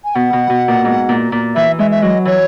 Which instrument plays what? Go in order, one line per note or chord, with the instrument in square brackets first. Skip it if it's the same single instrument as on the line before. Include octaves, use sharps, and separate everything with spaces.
[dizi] G#5
[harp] B2 [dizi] F#5
[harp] B2
B2
A#2
G#2
A#2
A#2
[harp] E3 [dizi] E5
[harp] G#3 [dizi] E5
[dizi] E5
[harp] F#3 [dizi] D#5
[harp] E3 [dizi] C#5